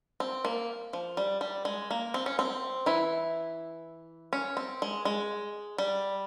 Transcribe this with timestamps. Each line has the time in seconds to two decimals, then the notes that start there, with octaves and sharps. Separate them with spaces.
0.20 C4
0.45 A#3
0.93 F3
1.17 G3
1.41 G3
1.65 G#3
1.91 A#3
2.14 C4
2.26 C#4
2.39 C4
2.86 E3 E4
4.33 C#4
4.57 C4
4.82 G#3
5.05 G#3
5.78 G3